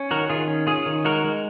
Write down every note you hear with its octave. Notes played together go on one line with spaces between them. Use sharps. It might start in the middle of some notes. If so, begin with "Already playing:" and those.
Already playing: C#4
D#3 F#4 A#4
D#3 F4 G#4
C#4
C#4 F4 G#4
D#3
G#3 F#4 A#4
G#3